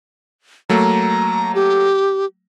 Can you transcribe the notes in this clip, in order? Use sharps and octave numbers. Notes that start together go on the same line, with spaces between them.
F#3 A3 A#3 A#5
G4